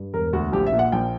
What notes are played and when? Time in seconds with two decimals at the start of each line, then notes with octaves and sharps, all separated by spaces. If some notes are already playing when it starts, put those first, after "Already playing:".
Already playing: G2
0.13 E1 A#4
0.33 D2 F#4
0.52 A#1 G4
0.66 E5
0.72 A#2
0.79 F#5
0.92 A#1 G5